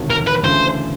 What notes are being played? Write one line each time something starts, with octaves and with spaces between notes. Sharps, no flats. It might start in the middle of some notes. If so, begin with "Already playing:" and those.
Already playing: E1 D2 C3 D#3
A#4
B4
D2 C#3 E3 A3 D4 C5